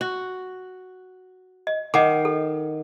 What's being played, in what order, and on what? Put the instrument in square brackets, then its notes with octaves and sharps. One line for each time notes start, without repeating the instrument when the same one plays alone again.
[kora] F#4
[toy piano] D#5
[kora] D#3 [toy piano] D#5 F#5 D6
[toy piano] A4